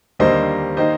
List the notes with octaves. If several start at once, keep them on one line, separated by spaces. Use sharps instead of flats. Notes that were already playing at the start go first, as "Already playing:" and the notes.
D#2 D3 G3 A#3 C5 D#5
D#3 A#3 C5 D#5